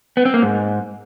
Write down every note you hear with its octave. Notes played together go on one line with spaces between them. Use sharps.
B3
C4
A#3
G#2